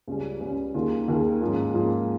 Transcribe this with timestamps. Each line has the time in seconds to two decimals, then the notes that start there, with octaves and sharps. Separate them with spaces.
0.07 C#2 C#3 G3 C#4
0.40 C#2 C#3 G3 C#4
0.74 D#2 D#3 A#3 F4 G#4
1.08 D#2 D#3 A#3 F4 G#4
1.41 G#2 F3 A#3 C#4 F4
1.74 G#2 F3 A#3 C#4 F4